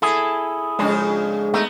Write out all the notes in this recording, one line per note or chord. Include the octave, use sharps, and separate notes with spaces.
E4 G#4 A4
F2 C#3 G#3 D4
A3 B3 D#4